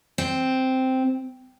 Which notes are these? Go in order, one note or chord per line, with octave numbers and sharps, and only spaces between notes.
C4